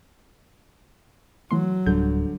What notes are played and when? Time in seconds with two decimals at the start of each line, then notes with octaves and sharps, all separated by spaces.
1.51 E3 F#3 A3 C6
1.86 D1 D3 G3 G6